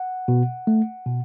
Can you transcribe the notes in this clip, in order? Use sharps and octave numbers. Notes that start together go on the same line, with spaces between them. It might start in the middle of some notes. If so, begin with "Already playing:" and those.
Already playing: F#5
B2
A3
B2